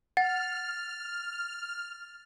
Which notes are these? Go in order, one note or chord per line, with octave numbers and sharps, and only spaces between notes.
F#5 F6 A6